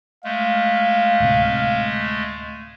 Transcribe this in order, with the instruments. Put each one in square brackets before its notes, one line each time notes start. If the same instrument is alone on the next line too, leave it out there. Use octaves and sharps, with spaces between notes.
[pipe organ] G#3 A3 [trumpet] F5
[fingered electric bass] D1 C3